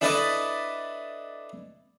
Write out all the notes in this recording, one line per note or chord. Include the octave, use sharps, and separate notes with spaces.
D4 E4 A4 B4 D5 D#5